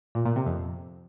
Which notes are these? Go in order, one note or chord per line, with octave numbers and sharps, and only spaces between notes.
A#2
A#2
C3
F2